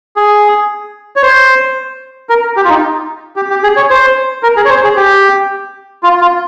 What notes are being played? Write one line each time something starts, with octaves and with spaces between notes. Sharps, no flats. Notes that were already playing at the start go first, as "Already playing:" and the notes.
G#4
C#5
C5
A#4
G4
F4
D#4
G4
G4
G#4
C#5
C5
A#4
G#4
C#5
C5
G#4
G4
F4
F4